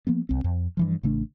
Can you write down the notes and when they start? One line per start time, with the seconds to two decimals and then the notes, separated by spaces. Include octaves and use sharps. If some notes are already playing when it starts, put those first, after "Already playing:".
0.07 F3 A#3 B3
0.29 C2 C4
0.44 F2
0.77 G2 E3 F3
1.03 A1 C#3 A3 D4